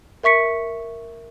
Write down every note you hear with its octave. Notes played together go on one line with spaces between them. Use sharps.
A#4 E5 C#6 B6 C#7